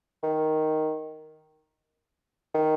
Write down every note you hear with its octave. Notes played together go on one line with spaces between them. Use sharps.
D#3
D#3